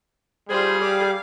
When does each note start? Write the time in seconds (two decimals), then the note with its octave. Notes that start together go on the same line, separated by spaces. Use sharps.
0.50 G3 F4 G#4 C5
0.81 F5 D6